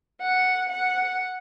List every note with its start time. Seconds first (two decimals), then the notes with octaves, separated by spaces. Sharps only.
0.21 F#5
0.69 F#5